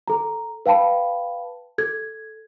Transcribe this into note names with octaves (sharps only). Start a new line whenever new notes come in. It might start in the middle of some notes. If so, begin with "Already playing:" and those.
A4 A#5
B4 F5 G5 A5 B5
A4 G#6